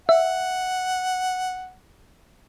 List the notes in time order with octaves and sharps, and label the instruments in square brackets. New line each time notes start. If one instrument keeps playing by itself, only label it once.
[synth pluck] E5 [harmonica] F#5